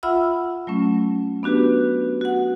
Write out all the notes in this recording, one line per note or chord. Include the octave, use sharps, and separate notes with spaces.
F4 E5 F#5 B5 E6 F6
F#3 A3 C#4
B3 D4 F#4 G4 B4
F#4 F#5